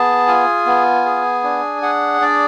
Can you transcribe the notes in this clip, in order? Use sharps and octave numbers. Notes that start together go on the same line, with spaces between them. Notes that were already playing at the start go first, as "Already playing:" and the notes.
Already playing: B3 G#4 A5
F4 G#5
B3
G#4
D4
G#4 F#5
D4 D5